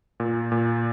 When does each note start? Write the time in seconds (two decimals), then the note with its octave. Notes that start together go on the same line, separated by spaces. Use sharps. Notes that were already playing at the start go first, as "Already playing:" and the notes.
0.20 A#2
0.52 A#2